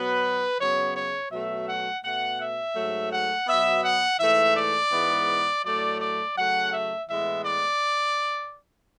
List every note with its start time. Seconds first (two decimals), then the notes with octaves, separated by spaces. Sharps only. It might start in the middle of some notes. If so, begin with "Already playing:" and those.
Already playing: B2 F#3 B3 B4
0.60 C#3 F#3 B3 C#5
0.96 C#5
1.32 B2 F#3 A3 E5
1.67 F#5
2.04 B2 A3 F#5
2.40 E5
2.76 G#2 F#3 A3
3.12 F#5
3.48 B2 F#3 B3 E5
3.83 F#5
4.20 G#2 E3 A3 E5
4.56 D5
4.92 G#2 E3 G#3 B3
5.64 A2 F#3 A3 D5
6.00 D5
6.36 C#3 F#3 A3 F#5
6.72 E5
7.08 A2 E3 G#3 B3 E5
7.44 D5